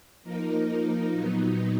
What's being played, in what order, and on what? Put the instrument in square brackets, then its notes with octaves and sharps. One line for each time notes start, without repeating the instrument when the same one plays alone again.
[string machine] F3 A#3 D#4 A#4
A#2 F#3 B3 D#4